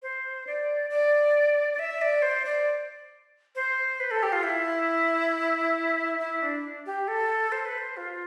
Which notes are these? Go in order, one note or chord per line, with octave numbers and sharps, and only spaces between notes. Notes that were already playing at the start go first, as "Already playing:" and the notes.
C5
D5
D5
D5
E5
D5
C5
D5
C5
B4
A4
G4
F4
E4
E4
D4
G4
A4
C5
B4
C5
F4